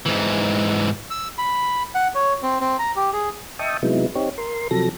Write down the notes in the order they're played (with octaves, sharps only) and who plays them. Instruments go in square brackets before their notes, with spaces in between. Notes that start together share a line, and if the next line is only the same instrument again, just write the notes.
[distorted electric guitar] G#2 E3
[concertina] E6
B5
F#5
C#5
C4
C4
A#5
G4
G#4
[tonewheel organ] D#5 E5 G5 A5 C#6 D#6
C3 F#3 G#3 B3 D#4 E4
C4 D#4 G4 C#5
A#4 C6
C3 F3 F#3 A4 A#6